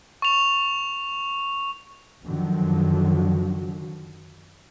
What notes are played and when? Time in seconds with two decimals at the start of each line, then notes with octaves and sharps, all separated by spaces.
0.22 C#6 F7
2.23 F#2 D3 D#3 F3 F#3